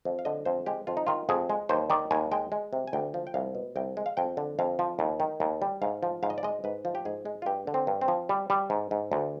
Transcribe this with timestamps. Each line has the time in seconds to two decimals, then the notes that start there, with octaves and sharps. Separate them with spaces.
0.05 F2
0.19 F5
0.25 D3 D#5
0.45 F2 C5
0.66 G#3 G4
0.87 F2 F4
0.97 D#4
1.07 D#3 F4
1.29 F2 G#4
1.50 G#3
1.69 D#2 C5
1.90 D#3 D5
2.11 D#2 G#5
2.32 G#3 G5
2.52 G#3
2.73 C3
2.88 G#5
2.93 D2 G5
3.14 F3
3.27 G5
3.34 C2 F5
3.55 B2
3.76 C2 G5
3.97 G#3
4.06 F5
4.17 F2 G5
4.37 D3
4.59 F2 F5
4.79 F3
4.99 D#2
5.20 D#3
5.40 D#2
5.62 G3
5.82 G#2 F5
6.03 F3
6.23 G#2 F5
6.30 D#5
6.38 D5
6.43 G#3 D#5
6.64 G#2 B4
6.85 F3
6.95 G4
7.05 G#2 G#4
7.25 G#3
7.42 F4
7.46 G2 G4
7.67 D3
7.74 C4
7.87 G2
8.01 C4
8.08 F3
8.29 G3
8.50 G3
8.70 G#2
8.91 G#2
9.12 D2